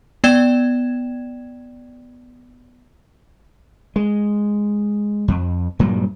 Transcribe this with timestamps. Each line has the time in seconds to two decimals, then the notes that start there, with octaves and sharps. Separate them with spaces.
0.24 B3 D5 G5 G#6 E7
3.96 G#3
5.28 F2
5.79 G2 A#2 F#3 G3